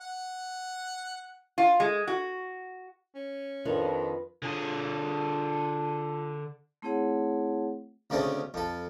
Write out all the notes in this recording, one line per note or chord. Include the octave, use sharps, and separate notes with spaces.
F#5
F4
G#3
F#4
C#4
F2 D#3 D4 F4 B4
D3 F4 G#4
A3 C4 E4 G#4 C#5 F#5
D2 C#3 A3 C4 C#4
F2 A4